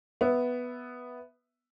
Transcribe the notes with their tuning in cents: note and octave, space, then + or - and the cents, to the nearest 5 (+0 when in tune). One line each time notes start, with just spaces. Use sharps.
B3 +0 E5 +0